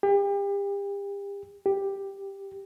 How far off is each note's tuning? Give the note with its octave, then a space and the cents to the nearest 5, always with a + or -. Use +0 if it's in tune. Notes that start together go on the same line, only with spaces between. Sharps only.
G4 +35
G4 +5